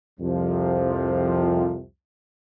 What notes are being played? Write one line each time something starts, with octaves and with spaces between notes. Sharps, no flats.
C2 F2 C3 F3